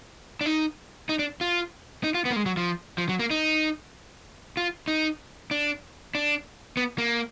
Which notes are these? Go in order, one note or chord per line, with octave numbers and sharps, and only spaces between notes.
D4
D#4
D#4
D4
F4
D#4
F4
B3
A#3
G#3
F#3
F3
F3
F#3
A#3
D#4
F4
D#4
D4
D4
B3
A#3